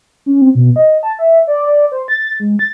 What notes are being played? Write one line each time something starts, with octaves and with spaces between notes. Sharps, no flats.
C#4
C4
B2
D#5
A5
E5
D5
D5
C5
A6
G#3
A6